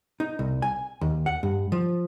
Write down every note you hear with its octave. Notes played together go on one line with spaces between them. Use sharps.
D#4
C2
G#5
D#2
F#5
G2
F3